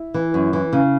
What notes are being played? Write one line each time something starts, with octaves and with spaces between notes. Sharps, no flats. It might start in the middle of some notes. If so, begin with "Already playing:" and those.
Already playing: E4
E3
F#2
E3
C#3